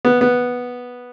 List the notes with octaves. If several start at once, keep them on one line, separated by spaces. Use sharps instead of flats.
B3
B3